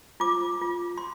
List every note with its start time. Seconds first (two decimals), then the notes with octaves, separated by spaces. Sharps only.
0.20 F4 D6
0.62 F4
0.98 C6